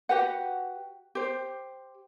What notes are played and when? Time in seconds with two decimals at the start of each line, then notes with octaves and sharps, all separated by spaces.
0.09 F#4 G4 B4 F#5
1.15 G4 C5